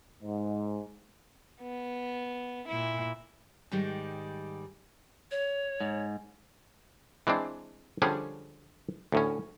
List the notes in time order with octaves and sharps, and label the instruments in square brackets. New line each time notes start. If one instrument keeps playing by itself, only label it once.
[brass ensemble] G#2
[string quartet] B3
A#2 E4
[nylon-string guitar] G#2 D#3 G3
[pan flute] C#5
[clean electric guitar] G#2
[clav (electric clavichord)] E3 G#3 C4 D4
D3 F3 G3 C#4 D4 G#4
D2 A2 C#4